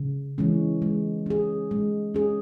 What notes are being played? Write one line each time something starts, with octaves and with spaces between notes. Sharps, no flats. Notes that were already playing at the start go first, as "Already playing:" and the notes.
Already playing: C#3
E3 G#3 C#4
G#3
C#4 G#4
G#3
C#4 G#4